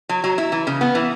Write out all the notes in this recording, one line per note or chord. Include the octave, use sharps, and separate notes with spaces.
F#3
F#3
E4
E3
C#3
B3
E3